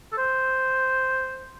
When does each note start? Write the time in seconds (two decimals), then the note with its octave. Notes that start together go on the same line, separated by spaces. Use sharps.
0.12 A4
0.18 C5